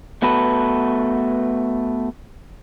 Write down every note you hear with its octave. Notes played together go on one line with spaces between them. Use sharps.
A3 B3 F#4 A4 B4